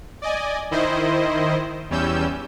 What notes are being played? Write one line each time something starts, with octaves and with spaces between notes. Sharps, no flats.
D5 D#5 G#5
D#3 E4 C5 D#5
E2 G3 C#4 E6 G6